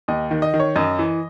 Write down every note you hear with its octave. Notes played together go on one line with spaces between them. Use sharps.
D#2 D#5
D#3
D#5
D#3
C#5
F#2 D#5
E3